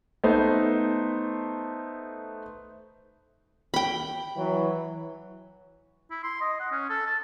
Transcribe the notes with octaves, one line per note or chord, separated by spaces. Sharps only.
A3 B3 D#4 C5
G5 B5
E3 F#3
E4
C6
D#5
F#5
C#4
A4
A5